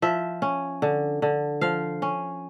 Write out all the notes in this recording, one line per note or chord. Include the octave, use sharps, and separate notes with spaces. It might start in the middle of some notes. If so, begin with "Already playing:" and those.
F3 E5
C#4
D3
D3
F3 F5
C#4